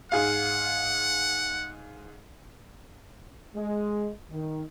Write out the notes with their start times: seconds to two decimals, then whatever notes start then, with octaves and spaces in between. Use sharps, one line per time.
0.12 G#2 G#4 F5 F#5
3.54 G#3
4.30 D#3